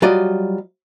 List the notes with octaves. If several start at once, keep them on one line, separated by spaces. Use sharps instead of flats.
F#3 G3 F4 D5 D#5